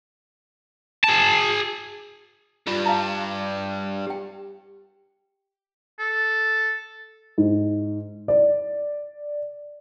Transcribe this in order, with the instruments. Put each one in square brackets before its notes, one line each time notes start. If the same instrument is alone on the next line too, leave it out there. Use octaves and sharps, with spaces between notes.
[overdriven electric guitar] G#4 A5
[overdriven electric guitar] G2 G3 [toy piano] F4
[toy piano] F5 A5 A#5
G4 G5
[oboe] A4
[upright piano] G#2
D5